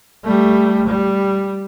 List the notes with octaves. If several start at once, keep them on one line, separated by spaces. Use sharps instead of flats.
G3 A3
G3